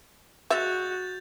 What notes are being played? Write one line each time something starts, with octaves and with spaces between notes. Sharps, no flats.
G#3 F#4 E5 G6 A6 F7